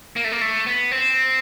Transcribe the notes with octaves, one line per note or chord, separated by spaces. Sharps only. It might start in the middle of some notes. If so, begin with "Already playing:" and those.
A#3
A3
A#3
A3
B3
C4